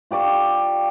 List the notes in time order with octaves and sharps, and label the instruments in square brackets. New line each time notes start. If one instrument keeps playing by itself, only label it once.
[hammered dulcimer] F4 G4 D5 C#6